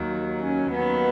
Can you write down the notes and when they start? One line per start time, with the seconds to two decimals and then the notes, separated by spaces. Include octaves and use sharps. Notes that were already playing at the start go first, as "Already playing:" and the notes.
Already playing: D#2 D#3 F#3
0.40 C#4
0.72 D#2 D#3 F#3 B3